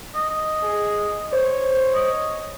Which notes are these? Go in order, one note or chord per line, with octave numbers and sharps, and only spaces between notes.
D#5
G#4
C5 C#5
D#5